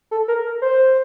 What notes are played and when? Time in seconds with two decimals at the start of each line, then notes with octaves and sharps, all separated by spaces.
0.11 A4
0.28 A#4
0.62 C5